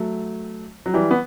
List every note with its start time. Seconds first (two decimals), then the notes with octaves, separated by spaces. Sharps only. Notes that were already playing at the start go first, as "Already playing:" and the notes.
Already playing: F#3 A3
0.86 F#3
0.94 E3 G3
1.11 B3